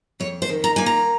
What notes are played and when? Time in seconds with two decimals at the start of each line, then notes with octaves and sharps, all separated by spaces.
0.20 F2 C#5
0.42 C5
0.49 D#3
0.64 A#5
0.76 A#3 G#5
0.86 A#5